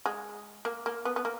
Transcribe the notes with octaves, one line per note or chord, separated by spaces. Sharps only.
G#3
A#3
A#3
B3
B3
A#3